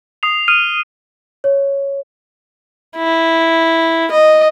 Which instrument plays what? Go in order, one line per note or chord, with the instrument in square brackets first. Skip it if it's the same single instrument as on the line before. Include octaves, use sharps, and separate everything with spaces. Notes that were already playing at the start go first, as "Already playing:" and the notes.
[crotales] D#6 C7 F7
D#6 F6 D#7
[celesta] C#5
[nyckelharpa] E4
D#5